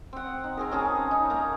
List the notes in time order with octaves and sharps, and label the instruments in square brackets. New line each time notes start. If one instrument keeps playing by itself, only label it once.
[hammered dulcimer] C4 F#5
D#4
C4 G#4 A#4
C#4 G#4 A5 A#5
D#4
A#3 A#5